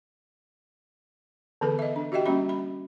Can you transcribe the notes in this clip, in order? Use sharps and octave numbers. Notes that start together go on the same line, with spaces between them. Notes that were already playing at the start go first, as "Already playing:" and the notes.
D3 E3 B3 G#4 A4 B4
D#5 E5
D4
F#4 G4 D#5 E5 G5
G3 A#3 C#4 F#4 B5
B5